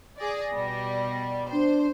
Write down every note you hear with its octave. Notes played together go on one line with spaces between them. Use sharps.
G#4 D5 A#6
B2 G3
D4 C5